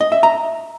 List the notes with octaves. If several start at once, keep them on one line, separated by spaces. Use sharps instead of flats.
D#5
E5
A#5